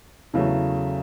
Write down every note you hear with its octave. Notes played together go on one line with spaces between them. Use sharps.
E2 C#3 F#3 A3